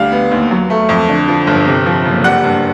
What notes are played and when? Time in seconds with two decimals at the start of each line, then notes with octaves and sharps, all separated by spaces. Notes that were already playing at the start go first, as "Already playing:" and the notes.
Already playing: D2 G3 F5
0.12 B3
0.31 D#2
0.51 F#3
0.70 A3
0.89 F2
1.09 D3
1.28 F3
1.47 G1
1.66 C3
1.86 F3
2.05 F#1
2.24 G3 F#5
2.44 G2